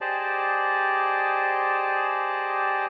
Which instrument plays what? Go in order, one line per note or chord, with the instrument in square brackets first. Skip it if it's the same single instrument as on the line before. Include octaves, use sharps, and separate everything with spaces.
[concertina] G4 G#4 C5 D5 D#5 A5